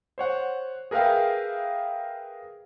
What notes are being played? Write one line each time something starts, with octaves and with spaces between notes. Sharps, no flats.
C5 C#5 F#5
G#4 A#4 B4 E5 F5 G5